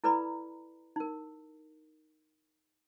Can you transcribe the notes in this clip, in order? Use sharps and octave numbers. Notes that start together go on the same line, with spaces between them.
E4 A4 B4 D5 A#5 B5
D#4 A#4